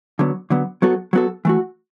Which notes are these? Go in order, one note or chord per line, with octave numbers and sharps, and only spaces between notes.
D3 F#3 B3
D3 F#3 B3
F#3 B3 F#4 A4
F#3 B3 F#4 A4
E3 A3 F#4